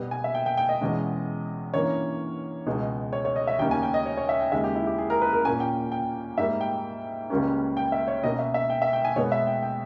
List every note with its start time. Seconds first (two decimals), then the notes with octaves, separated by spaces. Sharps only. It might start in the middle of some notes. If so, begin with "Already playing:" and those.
Already playing: B2 G3 B3
0.11 G#5
0.24 E5
0.34 G5
0.46 G5
0.57 G5
0.69 D#5
0.81 E2 B2 G#3 C#4
1.74 G2 E3 A#3 C#4 C#5
2.66 C#2 B2 G#3
3.13 C#5
3.25 C#5
3.36 D#5
3.47 E5
3.59 D#2 C#3 G3 A#3 C#4 G5
3.71 G#5
3.83 G5
3.94 D#5
4.06 C#5
4.17 C#5
4.29 E5
4.41 G5
4.52 D#2 C#3 G#3 E5
4.64 G4
4.75 E4
4.87 G4
4.98 G#4
5.10 A#4
5.22 B4
5.33 A#4
5.45 A#2 A#3 C#4 G#5
5.60 G5
5.92 G5
6.38 G#2 G3 A#3 E5
6.61 G5
7.30 C#2 C#3 G3 A#3 C#4
7.77 G5
7.92 E5
8.08 C#5
8.23 B2 A#3 C#4 D#5
8.39 E5
8.54 E5
8.70 G5
8.82 E5
8.93 G5
9.05 G#5
9.16 B2 G#3 B3 C#5
9.32 E5
9.47 G5
9.62 G5